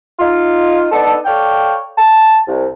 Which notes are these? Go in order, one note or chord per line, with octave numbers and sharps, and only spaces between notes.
D#4 F4
B3 D4 D#4 A4
A4 C#5 D5 F5 G5
A5
C2